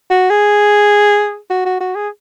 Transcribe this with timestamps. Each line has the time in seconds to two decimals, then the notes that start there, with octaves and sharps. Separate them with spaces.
0.10 F#4
0.30 G#4
1.50 F#4
1.65 F#4
1.80 F#4
1.95 G#4